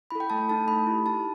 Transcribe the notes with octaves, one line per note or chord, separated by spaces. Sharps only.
E4 A4 B5
G5
A3 A5
D#4 A4 A5
A3 B5
E4 G4
D#4 A5